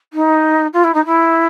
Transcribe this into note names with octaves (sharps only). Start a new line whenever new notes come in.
D#4
F4
E4
D#4
E4